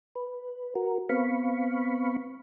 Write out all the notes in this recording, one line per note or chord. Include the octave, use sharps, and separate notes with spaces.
B4
F#4 A#4
B3 C4 F5 B5 C#6